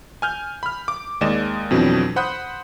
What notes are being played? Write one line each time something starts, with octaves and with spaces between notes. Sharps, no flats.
G#5 F6 G6
B5 F6
D6
D#2 G#3 D5 D#5 E7
F2 B2 E3 F#3 C4 D4
C5 F#5 B5 D#6 F#6 G6